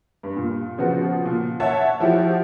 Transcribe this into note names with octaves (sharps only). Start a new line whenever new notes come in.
G2
A#2
C#3 F3 B3 F#4
A#2
C#5 E5 F#5 A5
F3 E4 F#4 G4